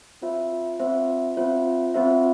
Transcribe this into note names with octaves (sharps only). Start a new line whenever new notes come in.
C4 F4 C5 E5
C4 F4 C5 E5
C4 F4 C5 E5
C4 F4 C5 E5